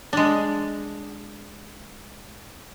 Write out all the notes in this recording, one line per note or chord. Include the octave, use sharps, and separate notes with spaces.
G#3 D4